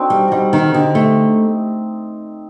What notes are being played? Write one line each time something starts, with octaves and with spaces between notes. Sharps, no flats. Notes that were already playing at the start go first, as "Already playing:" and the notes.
Already playing: C4 D4 D#4 F#4 A4
G3
G3 D#4 F#4
D#3
D3 D#4 G4
A3